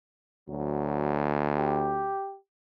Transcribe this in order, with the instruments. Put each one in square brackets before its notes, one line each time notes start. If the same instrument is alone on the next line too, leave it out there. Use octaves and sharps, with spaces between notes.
[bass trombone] D2 [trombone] F#3
[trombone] G4